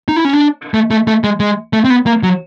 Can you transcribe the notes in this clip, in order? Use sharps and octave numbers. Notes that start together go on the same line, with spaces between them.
D#4
E4
C#4
D4
A3
A3
A3
G#3
G#3
A3
C4
B3
A#3
F#3